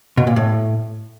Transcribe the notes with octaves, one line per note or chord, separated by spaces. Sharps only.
B2
A#2
A2